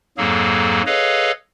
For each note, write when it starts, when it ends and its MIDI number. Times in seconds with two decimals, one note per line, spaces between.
0.18 0.82 41
0.18 0.82 44
0.18 0.82 54
0.18 0.82 58
0.18 0.82 68
0.18 0.82 69
0.86 1.32 68
0.86 1.32 69
0.86 1.32 71
0.86 1.32 73
0.86 1.32 75
0.86 1.32 77